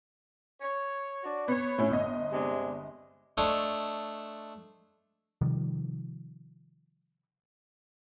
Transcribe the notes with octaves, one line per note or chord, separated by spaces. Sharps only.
C#5
D4 F#4 D5
B3 C#5
A2 C#4 E4
G1 D#5
C3 G#3 D4
A3 D4 C5 C#5 D#5
C3 D#3 F3 G3